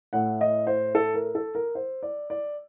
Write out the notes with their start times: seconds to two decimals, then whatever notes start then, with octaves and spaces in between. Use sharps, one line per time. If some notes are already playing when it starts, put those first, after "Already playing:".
0.13 A2 A3 F#5
0.41 D#5
0.67 C5
0.95 A4
1.14 A#4
1.35 A4
1.55 A#4
1.75 C5
2.03 D5
2.30 D5